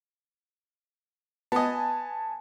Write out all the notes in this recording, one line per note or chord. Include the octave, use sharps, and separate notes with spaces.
B3 D#5 G#5 A5